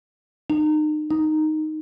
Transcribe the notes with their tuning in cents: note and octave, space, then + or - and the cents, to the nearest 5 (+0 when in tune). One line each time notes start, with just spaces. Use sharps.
D#4 -35
D#4 -5